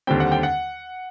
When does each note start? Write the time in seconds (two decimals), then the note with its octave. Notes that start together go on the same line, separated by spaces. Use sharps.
0.07 D#2 D3 G3 C4 G5
0.20 F#5
0.32 G5
0.43 F#5